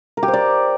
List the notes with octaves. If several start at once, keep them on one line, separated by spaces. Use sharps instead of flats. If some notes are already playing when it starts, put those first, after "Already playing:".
A#4
G4
C5
D5